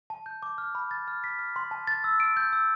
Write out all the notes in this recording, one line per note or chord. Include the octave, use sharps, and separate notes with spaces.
A5
G6
D6
F6
B5
A6
F6
B6
F6
C6
A5
A6
E6
D7
G6
E6